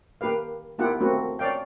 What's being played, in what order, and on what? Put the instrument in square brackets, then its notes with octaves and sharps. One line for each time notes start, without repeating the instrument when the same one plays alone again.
[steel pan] A#3 G4 B4 F5
A#3 B3 E4 F4 G4 F#5
A3 A#3 C4 F#4 B4
C#5 D5 F5 G5